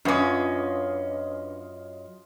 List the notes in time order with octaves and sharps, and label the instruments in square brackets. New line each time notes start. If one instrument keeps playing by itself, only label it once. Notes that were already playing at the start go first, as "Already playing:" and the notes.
[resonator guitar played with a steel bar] F#2 C#4 [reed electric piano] D4 B4 D6 [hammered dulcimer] F4 G#4 D#5